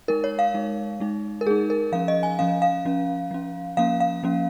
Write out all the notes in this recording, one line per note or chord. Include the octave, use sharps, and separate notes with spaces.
G#3 D#4 A#4
C#5
F5
G#3 D#4
G#3 D#4
A#4
G#3 D#4 G#4
A#4
F3 C#4 F5
D#5
G#5
F3 C#4 F5
F5
F3 C#4
F3 C#4
F3 A#3 C#4 F5
F5
F3 A#3 C#4